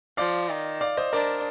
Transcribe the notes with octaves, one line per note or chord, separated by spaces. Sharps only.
F3 D5 F5
D#3
D5 F5
C5 D#5
D4 A#4 D5